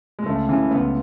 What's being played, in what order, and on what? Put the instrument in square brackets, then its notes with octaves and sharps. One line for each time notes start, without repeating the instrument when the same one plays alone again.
[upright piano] G#3
[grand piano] C#2 [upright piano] A3
[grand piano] C#3 E3
[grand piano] C#2 [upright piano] B3